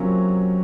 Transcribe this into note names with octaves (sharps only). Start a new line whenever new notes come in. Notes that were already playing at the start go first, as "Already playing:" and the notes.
Already playing: C3 F#3 A#3 C#4 F4